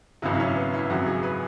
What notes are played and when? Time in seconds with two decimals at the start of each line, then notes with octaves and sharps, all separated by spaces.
0.22 G#1 F#2 C#3 F#3 E4
0.33 E4
0.40 C#4
0.56 B3
0.74 E4
0.90 G#1 F#2 C#3 F#3 F#4
1.06 G#4
1.23 B4